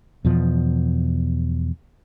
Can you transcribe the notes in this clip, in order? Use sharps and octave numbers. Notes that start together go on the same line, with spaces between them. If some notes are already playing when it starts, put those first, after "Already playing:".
E2 B2 F3